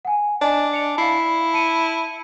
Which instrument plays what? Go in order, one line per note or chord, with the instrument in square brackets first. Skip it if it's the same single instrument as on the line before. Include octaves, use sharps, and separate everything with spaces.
[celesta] F#5 G#5
[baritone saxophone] D4 [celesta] D#5 G#5
[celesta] C#7 F7
[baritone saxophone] E4 [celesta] F5 C7
[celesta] A5 C#7 D#7